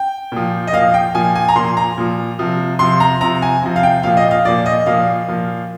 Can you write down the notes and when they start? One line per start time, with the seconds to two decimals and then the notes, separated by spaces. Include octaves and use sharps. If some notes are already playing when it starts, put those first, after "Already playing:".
Already playing: G5
0.32 A#2 F3
0.67 D#5
0.73 A#2 F3 F5
0.94 G5
1.15 A#2 F3 G#5
1.36 G#5
1.48 A#5
1.56 A#2 F3 C6
1.77 A#5
1.98 A#2 F3
2.39 C3 F3
2.79 C3 F3 C6
3.00 A#5
3.21 C3 F3 A#5
3.42 G#5
3.63 C3 F3
3.76 F5
3.83 G5
4.03 A#2 F3 F5
4.17 D#5
4.31 F5
4.45 A#2 F3 D5
4.66 D#5
4.86 A#2 F3 F5
5.28 A#2 F3